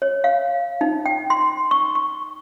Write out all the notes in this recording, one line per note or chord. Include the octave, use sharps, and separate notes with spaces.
C#5
F5
D#4
G5
C6
C#6
C#6